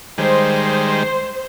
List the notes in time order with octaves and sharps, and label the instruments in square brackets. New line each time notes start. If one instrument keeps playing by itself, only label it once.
[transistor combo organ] D#3 G3 G#3 [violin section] C5